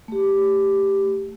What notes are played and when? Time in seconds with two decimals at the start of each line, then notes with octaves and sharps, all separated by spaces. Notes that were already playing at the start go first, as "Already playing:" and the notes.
0.08 A3 G4